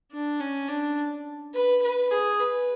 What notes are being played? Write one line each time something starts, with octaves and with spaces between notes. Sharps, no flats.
D4
C#4
D4
B4
B4
G#4
B4